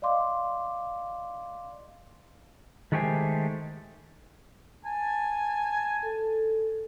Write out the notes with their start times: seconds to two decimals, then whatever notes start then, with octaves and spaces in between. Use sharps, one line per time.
0.02 D5 D#5 F5 C6 D6
2.92 D#3 G#3 A3 G4 C5 G#5
4.85 G#5 A5
6.03 A4